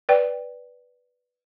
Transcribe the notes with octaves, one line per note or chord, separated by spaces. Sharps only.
B4 D5 G5